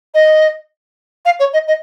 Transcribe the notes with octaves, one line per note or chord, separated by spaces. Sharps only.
D#5
F5
C#5
D#5
D#5